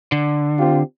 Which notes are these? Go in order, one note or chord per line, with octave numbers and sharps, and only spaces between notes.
D3
C4 F4 G4